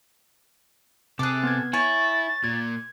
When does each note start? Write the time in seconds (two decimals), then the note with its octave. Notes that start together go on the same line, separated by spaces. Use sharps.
1.19 C3 G#4 A4 D6 F#6
1.43 B3 G#6
1.73 E4 C#5 G#5 C#6 A6
2.44 A#2 G#6